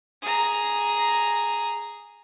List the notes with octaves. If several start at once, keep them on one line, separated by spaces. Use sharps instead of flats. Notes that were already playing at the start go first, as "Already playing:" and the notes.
G#4 A#5